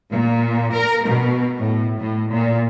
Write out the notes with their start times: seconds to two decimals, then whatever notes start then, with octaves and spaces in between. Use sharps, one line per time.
0.11 A#2
0.73 A#4
1.06 B2
1.60 A2
1.99 A2
2.31 A#2